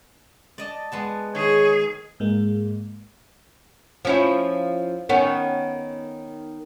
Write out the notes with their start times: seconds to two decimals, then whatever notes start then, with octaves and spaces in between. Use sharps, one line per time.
0.58 D5 D#5 A5
0.92 G#3 B3 A5
1.35 D#3 G#4 C#5
2.20 G#2 G#3 A#3
4.05 F3 C#4 E4
5.09 D#3 B3 C#4